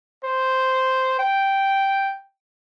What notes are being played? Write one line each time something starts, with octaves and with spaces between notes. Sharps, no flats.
C5
G5